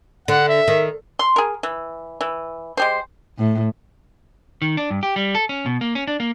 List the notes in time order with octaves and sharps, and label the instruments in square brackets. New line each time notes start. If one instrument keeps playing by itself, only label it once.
[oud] D3 [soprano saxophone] F#5
[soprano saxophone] E5
[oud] D#3
[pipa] C6
G#4 A#4
E3
E3
G#3 G4 C5
[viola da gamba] A2
[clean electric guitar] D#3
D4
G2
G4
G3
A4
C#4
B2
A#3
C#4
D4
A#3